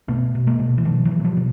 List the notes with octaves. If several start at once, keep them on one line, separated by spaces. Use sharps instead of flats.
B2 A3 B3
B2
G#3 A#3
B2
E3
B2 D#3 F3
E3 F#3
B2
F#3
F3 G3
B2